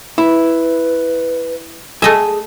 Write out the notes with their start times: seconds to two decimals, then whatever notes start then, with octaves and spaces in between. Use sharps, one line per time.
0.18 E4 B4
2.02 A3 G#4 D#5 E5 G#5